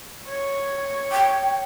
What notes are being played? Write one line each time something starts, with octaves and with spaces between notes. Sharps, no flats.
C#5
G5